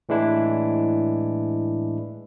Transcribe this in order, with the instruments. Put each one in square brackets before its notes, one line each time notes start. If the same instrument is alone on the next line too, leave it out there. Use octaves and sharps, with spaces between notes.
[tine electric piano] A2 E3 G#3 D4 E4